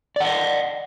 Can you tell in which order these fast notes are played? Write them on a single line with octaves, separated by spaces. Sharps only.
D5 F#5 D#5